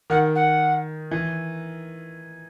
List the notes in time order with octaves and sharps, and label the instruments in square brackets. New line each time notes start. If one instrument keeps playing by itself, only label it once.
[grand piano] D#3 [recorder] F#5
[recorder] F#5
[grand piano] E3